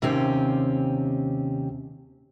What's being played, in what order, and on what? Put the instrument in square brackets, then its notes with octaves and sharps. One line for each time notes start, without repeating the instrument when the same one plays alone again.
[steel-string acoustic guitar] D#2 C3 C4 C#4 G4